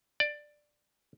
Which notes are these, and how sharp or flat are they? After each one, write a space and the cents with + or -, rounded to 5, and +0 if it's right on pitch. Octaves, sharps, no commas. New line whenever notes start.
D5 +10